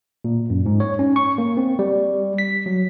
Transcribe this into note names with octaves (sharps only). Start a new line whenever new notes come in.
A#2
F#2
G#2
C#5
C#4
C#6
A#3
C4
G3
B6
F#3